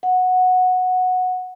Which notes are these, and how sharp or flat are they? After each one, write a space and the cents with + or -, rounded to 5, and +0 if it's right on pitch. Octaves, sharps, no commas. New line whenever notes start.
F#5 -10